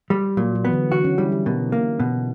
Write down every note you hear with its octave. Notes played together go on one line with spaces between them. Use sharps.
G3
A#2 F#3
F#3
E3 B3
D3
E3 F#4
C#4
G3 E4
G4
B2 A#4
A#3
B2